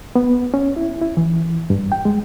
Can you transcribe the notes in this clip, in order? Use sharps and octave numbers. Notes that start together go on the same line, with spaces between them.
B3
C#4
E4
E4
E3
G2
G5
G#3